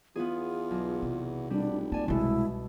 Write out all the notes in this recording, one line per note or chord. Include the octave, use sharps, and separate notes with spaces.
E2 B3 F4 G#4
B1
C3
F1 G3 D4
A#3 D5 G#5 A5
C2 B2 G#3 A3 E4